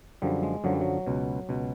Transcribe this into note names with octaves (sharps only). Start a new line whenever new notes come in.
F#2 D3 F3 G3
G#3
F#2 D3 F3 F#3
G3
F#3
C#2 B2
C#2 B2